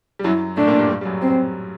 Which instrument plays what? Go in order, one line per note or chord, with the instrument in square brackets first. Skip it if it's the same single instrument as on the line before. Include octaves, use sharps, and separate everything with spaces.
[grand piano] G3
[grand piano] F#2 F#3 [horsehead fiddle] E4
[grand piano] A2 A3 [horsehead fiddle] D4
[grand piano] A#2 A#3
G2 G3
G2 G3
G3
F#2 F#3
[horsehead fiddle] C4